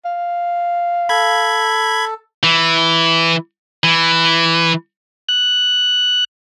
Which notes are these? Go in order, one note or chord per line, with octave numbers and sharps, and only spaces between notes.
F5
A4 B5 G#6
E3
E3
F#6